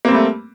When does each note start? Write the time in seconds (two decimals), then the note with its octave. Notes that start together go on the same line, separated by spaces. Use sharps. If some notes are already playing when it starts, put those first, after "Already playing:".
0.05 A#3
0.08 C4
0.11 G3
0.15 A3